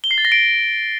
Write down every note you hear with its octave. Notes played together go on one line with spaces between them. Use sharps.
G7
C7
A6
A#6
D7